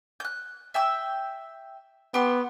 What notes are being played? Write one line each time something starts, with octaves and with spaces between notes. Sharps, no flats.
F#6 G6
E5 G5 E6
B3 G4 C6